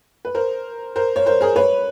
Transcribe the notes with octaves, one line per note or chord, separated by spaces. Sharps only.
B4
A#4 C5
A#4 C5
C#5
A#4 C5
G#4 A#4
B4 C#5